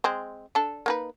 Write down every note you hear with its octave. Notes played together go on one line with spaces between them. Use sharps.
G#3 C4
D4 A4
A#3 D#4 B4